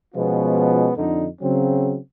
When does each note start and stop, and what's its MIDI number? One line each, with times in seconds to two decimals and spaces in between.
0.15 0.91 47
0.15 0.91 53
0.15 0.91 56
0.15 0.91 59
0.15 0.91 61
0.15 0.91 65
0.97 1.25 41
0.97 1.25 50
0.97 1.25 63
1.42 1.97 49
1.42 1.97 54
1.42 1.97 60